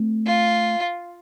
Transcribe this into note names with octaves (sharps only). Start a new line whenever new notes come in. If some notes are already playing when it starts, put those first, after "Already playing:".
Already playing: A3 C4
F4